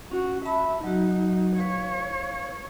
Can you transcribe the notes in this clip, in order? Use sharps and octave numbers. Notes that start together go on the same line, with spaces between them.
C#4 F#4
E5 A5 B5
F#3 D#4 F#4
B4 C#5 F5